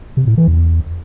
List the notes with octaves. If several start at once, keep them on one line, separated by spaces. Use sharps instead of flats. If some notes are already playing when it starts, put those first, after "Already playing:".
C3
A2
E3
E2